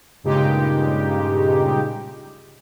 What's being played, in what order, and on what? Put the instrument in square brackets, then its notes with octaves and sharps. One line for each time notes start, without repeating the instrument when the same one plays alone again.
[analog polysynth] G2 A#2 C#3 G#3 D#4 G4